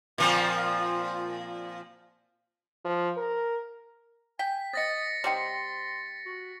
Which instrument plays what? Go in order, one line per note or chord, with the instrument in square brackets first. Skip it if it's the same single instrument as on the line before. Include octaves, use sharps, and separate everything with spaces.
[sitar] A#2 F3 C4
[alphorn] F3
A#4
[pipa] G5 [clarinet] G#5 [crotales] B6
[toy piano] C5 D#5 [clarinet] D#6 [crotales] A6 A#6 C#7
[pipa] G3 C4 D#4 [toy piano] C5 G5 [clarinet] C6
[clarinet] F#4